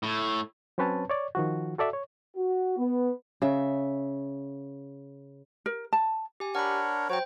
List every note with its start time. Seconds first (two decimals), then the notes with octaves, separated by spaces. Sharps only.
0.03 A2
0.78 F#3 C4 C#4 B4 C#5 A5
1.10 C#5 D5
1.35 D#3 F3 F#4
1.78 F#4 A4 D5 E5
1.93 C#5
2.37 F#4
2.78 B3
3.42 C#3 E5
5.66 A#4
5.93 A5
6.40 G4 G#5
6.55 D4 A#4 C#5 F#5 B5
7.10 F#3 F#4 C5 C#5 G5